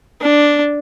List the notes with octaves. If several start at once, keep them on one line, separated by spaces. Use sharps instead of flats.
D4